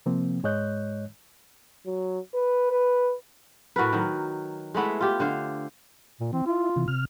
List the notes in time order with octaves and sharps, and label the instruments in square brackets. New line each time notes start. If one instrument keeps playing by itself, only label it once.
[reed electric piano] C3 F3 A#3 C4
G#2 G#3 C#5 D#5 F#6 G6
[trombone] F#3
B4
B4
[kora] A2 F#4 A#4 B4
D#3 F#3
G#3 A3 B3 E4
F4 G4
D3 C5 F5
[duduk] A#2
[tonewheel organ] E3 [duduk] C4
[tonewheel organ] E4 [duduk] F4
[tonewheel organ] C3 E3
C3 F6